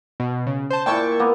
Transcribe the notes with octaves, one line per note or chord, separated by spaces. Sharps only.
B2
C#3
C5 A5
A#2 E4 G5 A5 C#6
A#3 B3